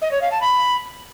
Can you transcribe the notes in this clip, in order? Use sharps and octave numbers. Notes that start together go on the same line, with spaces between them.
D#5
C#5
F5
A5
B5